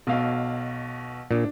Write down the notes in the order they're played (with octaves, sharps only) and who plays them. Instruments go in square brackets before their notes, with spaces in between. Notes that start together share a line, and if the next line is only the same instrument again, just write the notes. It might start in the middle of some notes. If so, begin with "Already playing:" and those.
[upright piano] B1 B2 F5
[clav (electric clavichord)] A#2 [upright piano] D4